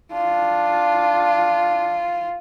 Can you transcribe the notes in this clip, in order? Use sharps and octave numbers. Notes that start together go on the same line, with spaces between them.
D4 F4